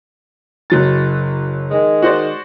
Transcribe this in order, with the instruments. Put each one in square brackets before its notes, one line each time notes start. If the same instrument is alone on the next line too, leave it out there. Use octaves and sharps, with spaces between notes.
[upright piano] F#1 F#3 A6
[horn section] D#3 G#3
[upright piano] F#4 C5 D5